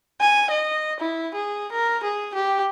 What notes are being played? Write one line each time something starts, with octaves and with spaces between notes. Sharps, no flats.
G#5
D#5
E4
G#4
A#4
G#4
G4